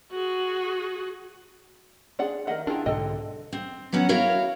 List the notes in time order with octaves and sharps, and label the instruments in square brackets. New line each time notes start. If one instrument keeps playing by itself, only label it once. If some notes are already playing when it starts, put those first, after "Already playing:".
[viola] F#4 G#4
[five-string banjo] D4 F4 F#5 [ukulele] G#4 D5
[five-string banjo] D#3 F#5 [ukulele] A#4 D#5 E5
[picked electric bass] D4 [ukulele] E4 G#4 G5 [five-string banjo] F4 A#4
[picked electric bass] B1 G#2 D3 [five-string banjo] C4 D#5 [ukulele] A4 G5
[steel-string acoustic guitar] C4
F#3 B3 C#4 F#5
E4 F#4 A#4 C#5 F5